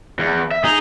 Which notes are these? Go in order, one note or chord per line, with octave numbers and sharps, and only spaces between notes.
E2
E5
D#4 G#4